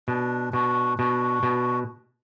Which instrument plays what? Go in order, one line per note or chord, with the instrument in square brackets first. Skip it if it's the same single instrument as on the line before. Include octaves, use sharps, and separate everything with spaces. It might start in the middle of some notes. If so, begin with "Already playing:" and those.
[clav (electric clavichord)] B2 [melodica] D4
[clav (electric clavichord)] B2 [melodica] D4 F#4
[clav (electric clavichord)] B2 [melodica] D4 F#4
[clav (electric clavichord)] B2